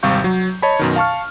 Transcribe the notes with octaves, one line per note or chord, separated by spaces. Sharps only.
G#1 C3 G3 F5 C#6 G6
F#3
C#5 D#5 A5 B5
F#2 B2 D#3
F5 A5 C#6 F6